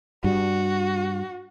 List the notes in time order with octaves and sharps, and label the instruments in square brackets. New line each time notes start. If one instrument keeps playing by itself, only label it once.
[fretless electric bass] G2 G3 [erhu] F#4